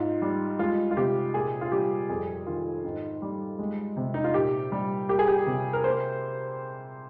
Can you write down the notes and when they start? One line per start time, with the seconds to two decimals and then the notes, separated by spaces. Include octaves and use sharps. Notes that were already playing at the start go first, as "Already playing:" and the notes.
Already playing: G#2 F4
0.22 G3
0.59 G#3 F4
0.91 F4
0.97 C3 G4
1.34 A#2 G#4
1.61 F4
1.72 G3 G4
2.09 F2 G#4
2.47 D#3 F4
2.84 G#2
3.22 G3
3.59 G#3
3.97 C3
4.14 D#4
4.24 F4
4.34 A#2 G4
4.72 G3
5.09 A#3 G4
5.19 G#4
5.28 G4
5.47 C3
5.73 A#4
5.84 A#3 C5